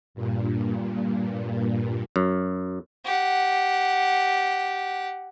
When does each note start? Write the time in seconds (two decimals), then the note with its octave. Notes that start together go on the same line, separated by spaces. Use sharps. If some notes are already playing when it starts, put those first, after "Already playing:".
0.14 G2 A#2
2.16 F#2
3.05 G4 F#5